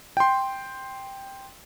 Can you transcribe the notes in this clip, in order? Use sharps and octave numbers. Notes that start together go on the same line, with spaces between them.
G5 C6